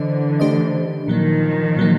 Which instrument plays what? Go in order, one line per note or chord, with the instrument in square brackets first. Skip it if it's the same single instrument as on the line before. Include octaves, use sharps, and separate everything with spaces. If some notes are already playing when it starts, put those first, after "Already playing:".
Already playing: [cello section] D3 E3 [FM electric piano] D4 C5 D#5
[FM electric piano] A3 D4 G4 C5 D#5
[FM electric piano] A#2 F#3 A#3 [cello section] D#3 F3
[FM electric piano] A#2 F#3 A#3